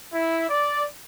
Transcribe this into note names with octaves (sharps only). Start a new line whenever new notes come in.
E4
D5